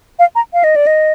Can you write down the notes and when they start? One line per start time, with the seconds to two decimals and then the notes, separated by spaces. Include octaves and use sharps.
0.19 F5
0.35 A#5
0.53 F5
0.64 D#5
0.76 D5
0.87 D#5